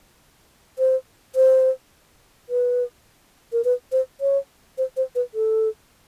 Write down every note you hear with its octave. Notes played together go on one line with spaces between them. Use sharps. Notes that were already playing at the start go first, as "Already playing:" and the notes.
C5
C5
B4
A#4
B4
C5
C#5
C5
C5
B4
A4